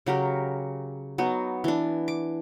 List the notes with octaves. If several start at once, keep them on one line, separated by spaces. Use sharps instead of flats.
C#3 F#3 G4 A#4
F#3 B3 D#4
E3 D4
D6